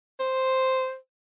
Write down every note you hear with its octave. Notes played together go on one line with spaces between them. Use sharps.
C5